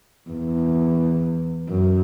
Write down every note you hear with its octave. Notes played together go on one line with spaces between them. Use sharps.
E2
F#2